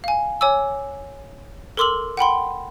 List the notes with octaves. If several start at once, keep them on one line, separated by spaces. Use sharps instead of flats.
F5 G#5
C#5 G#5 D6 E6
A4 A#4 C6 D6 E6 F#7
F#5 G5 B5 C6